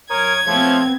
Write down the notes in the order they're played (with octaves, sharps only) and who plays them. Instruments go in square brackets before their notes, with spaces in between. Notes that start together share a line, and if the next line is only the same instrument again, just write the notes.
[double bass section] F#2 [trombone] A#4 [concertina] C#5 D#6 [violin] G#6
[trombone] F3 [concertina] A3 C#5 [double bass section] B3 C4